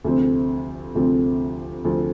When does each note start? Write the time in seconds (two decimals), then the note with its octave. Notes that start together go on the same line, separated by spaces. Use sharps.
0.04 D2 C3 F3 C4
0.95 D2 C3 F3 C4
1.85 D2 C3 F3 C4